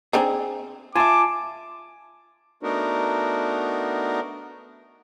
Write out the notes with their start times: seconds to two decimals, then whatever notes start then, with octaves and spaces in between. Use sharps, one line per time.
0.13 C4 D4 D#4 G#4 G#5
0.96 F4 E5 G#5 A5 D6
2.63 A3 B3 D4 D#4 F#4 A#4